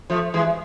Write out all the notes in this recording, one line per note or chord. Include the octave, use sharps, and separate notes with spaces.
F3 A3
E3 G#3